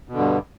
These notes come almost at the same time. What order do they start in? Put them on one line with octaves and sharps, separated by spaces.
B2 D3 G2